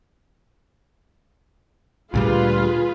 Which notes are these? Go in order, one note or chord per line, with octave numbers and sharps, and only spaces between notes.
D2 A#2 G3 F4 G#4 B4